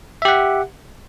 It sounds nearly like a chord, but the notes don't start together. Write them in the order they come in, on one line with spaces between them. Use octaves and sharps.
E5 G4 F#5